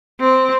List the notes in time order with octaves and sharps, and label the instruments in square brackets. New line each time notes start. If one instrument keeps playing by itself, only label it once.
[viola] C4